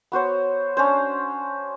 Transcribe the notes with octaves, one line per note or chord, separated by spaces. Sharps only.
B3 F#4 C5 C#5
C#4 D4 C5